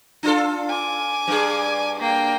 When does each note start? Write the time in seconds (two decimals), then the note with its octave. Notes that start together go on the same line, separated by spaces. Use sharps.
0.23 D4 F4 A4
0.69 G#5 D6
1.28 G2 G#4
2.00 A#3 G5